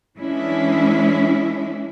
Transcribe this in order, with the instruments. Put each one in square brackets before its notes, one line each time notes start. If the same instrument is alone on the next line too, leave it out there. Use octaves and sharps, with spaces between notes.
[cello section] E3 G#3 C#4 D4 E4